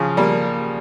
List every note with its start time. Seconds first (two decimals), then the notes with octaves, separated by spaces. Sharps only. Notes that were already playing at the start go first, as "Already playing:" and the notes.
Already playing: C#3 F3
0.17 G3 A#3